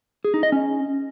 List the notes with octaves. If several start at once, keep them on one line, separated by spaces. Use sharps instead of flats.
G#4
D#4
D#5
C#4